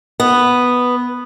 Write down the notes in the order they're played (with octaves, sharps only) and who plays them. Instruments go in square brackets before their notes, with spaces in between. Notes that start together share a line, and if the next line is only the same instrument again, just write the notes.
[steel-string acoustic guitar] B3